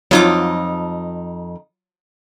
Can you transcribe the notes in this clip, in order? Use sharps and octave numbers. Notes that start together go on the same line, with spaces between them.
F2 F#3 D#4 F4 D6